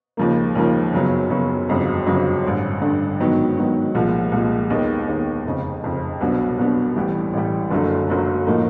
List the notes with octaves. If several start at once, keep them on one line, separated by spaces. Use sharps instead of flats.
D#2 C#3 F3 A#3
D#2 C#3 F3 A#3
F#2 C#3 F#3 B3
F#2 C#3 F#3 B3
G1 F2 C#3 F#3
G1 F2 C#3 F#3
A1 G2 D3
A1 G2 D3
G#2 D#3 F#3 B3
G#2 D#3 F#3 B3
C2 A#2 F3 G#3
C2 A#2 F3 G#3
D#2 D#3 G#3 B3
D#2 D#3 G#3 B3
F1 F2 C#3
F1 F2 C#3
C2 B2 F#3 B3 D4
C2 B2 F#3 B3 D4
A1 A2 E3 G3
A1 A2 E3 G3
F#1 F#2 D3 F#3 A3
F#1 F#2 D3 F#3 A3
A2 F3 A#3 D#4